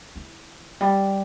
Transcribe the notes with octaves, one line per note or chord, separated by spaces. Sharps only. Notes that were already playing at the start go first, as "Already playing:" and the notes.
E3
G3